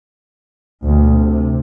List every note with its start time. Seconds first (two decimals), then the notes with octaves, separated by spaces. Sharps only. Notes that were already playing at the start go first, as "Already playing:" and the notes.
0.85 D2 B2
1.19 C3